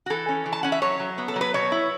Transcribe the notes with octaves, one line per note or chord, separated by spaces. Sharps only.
F#4
E3 A4
C#4
E3
A5
C#4 F#5
E5
F#3 C#5
F#3
B3
A4
F#3
B4
B2 C#5
E4